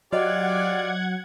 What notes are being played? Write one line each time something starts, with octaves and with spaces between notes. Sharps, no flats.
F#3 F4 G4 D5 D#5 F#5 G#6